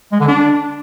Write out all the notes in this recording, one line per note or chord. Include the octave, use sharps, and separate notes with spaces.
G#3
D3
D4